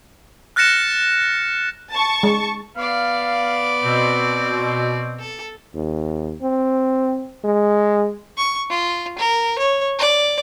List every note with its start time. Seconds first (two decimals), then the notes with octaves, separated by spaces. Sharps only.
0.56 F6 F#6 A6 A#6 C#7 E7
1.91 A5 C#6
2.23 G#3
2.77 B3 D5 F5
3.83 B2 C4
5.19 A4
5.75 D#2
6.42 C4
7.44 G#3
8.38 C#6
8.70 F4
9.19 A#4
9.59 C#5
9.99 D5